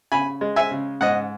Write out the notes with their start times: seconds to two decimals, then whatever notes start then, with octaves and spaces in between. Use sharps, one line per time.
0.12 C#3 G#5 B5
0.41 G#3
0.56 E5 G#5
0.71 C#3
1.01 G#2 D#5 F#5